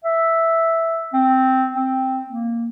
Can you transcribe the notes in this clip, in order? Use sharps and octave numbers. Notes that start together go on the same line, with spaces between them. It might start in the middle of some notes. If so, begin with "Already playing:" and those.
E5
C4
C4
A#3